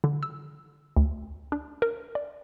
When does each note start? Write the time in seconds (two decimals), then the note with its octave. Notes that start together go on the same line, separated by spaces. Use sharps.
0.04 D3
0.23 E6
0.97 D2
1.52 D4
1.82 A#4
2.15 D5